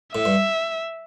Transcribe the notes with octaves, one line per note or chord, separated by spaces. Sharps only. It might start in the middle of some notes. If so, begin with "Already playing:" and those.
A2 E5
G2